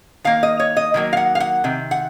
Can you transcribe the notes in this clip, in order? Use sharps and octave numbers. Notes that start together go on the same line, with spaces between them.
D#3 A#3 F5
D#5
C#5
D#5
D#3 F#3 A#3
F5
F#5
F5
F#5
C3 D#3
F#5